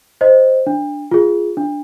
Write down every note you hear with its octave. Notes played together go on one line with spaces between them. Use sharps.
C5 D#5
D4
F4 G#4
D4